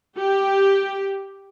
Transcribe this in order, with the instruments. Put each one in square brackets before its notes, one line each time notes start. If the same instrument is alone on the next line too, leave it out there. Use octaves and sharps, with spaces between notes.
[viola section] G4